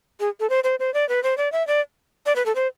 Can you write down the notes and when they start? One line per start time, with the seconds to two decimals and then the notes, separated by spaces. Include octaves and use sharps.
0.20 G#4
0.40 A4
0.50 C5
0.64 C5
0.80 C5
0.94 D5
1.09 B4
1.23 C5
1.38 D5
1.52 E5
1.67 D5
2.26 D5
2.36 B4
2.46 A4
2.55 C5